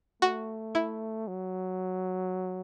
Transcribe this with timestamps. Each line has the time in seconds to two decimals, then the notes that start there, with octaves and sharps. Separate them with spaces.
0.22 A3 F#4
0.75 E4
1.28 F#3